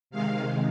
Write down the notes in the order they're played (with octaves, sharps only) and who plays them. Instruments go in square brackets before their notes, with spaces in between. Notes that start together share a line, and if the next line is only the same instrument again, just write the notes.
[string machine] C3 D#3 G#3 F5